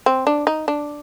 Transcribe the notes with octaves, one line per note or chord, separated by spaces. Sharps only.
C4
D4
D#4
D4